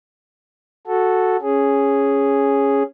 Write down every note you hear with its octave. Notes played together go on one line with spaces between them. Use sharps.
F#4 A4
C#4 G#4